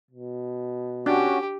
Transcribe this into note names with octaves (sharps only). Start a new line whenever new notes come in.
B2
C#4 D4 F#4 G4